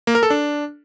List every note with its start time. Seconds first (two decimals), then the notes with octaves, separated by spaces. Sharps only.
0.07 A#3
0.15 A#4
0.23 A4
0.30 D4